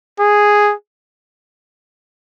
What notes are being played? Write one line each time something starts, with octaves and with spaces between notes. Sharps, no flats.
G#4